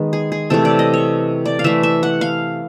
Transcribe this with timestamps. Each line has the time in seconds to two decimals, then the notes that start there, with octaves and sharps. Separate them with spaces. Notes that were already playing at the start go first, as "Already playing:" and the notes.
Already playing: D#3 G#3 B3
0.13 G#4
0.32 G#4
0.50 C3 E3 A3 A4
0.65 D5
0.79 D#5
0.94 C#5
1.45 D5
1.59 F5
1.64 E3 A3 E5
1.83 E5
2.03 F#5
2.21 F5